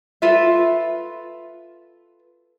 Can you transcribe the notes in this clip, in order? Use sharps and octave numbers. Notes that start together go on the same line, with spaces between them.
F4 A4 B4 E5